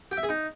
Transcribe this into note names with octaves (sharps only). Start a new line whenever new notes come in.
G4
E5
G#4
D#4